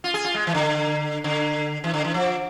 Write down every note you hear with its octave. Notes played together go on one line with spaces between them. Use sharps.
F4
G#4
F4
G#3
E3
D3
D3
E3
D3
E3
F3